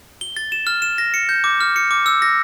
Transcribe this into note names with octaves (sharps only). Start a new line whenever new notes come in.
G7
A6
E7
F6
E7
A#6
C#7
G6
D6
F6
C#7
D6
E6
A#6